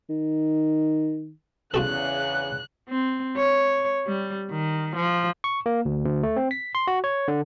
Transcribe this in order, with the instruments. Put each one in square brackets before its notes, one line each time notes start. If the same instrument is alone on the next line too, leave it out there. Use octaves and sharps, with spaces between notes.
[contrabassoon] D#3
[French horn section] E2 C#3 [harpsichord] F4 F#4 A4 [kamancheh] F#6
[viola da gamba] C4
C#5
G3
D#3
F3
[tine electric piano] C#6
A#3
D2
D2
A3
C4
B6
C6
F#4
C#5
D3